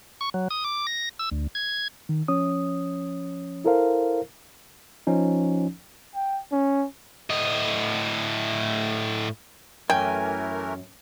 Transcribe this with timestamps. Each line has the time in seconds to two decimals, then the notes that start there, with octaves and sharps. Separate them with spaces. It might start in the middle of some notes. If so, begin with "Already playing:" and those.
0.21 C#6
0.34 F#3
0.50 D#6
0.64 D6
0.87 A#6
1.19 E6
1.31 D2
1.55 G#6
2.09 D#3
2.28 F3 C#4 C#5 D#6
3.65 E4 A4 A#4 C5 F5
5.07 F3 C#4 D#4
6.15 G5
6.52 C#4
7.30 A2 D#5
9.90 F#2 E3 A3 A#4 G5 G#5